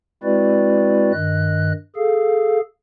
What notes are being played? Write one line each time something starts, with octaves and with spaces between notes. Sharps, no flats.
G#3 C4 E4 F#4 B4 D5
G2 D#3 D#5 F#6
G#4 A4 F5